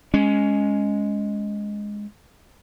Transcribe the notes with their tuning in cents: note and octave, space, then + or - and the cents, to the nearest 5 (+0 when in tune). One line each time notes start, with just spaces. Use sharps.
G#3 +0 C#4 +10